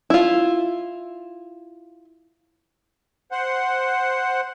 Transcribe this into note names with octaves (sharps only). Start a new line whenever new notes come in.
E4 F4
C5 F#5